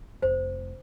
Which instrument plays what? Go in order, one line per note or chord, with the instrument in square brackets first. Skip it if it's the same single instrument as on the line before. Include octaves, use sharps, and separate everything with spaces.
[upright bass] F1 [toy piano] C5